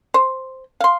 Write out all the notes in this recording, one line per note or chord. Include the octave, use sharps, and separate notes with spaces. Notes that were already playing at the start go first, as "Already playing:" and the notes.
C5
F5 C6